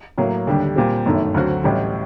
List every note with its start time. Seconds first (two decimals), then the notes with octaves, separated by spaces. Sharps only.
0.18 A2 F#3 A#3
0.47 D#2 D3 G3 D4 G4
0.76 A#2 G3 C4 G4
1.05 G1 F#2 D#3 A3
1.34 D2 D3 F#3 C4 F#4
1.64 A1 A2 G3